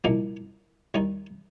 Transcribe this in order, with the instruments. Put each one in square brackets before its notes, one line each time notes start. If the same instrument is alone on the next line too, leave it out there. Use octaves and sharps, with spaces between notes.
[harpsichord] C2 A#2 F3 A#3 D#4
D#2 D#3 G3 D#4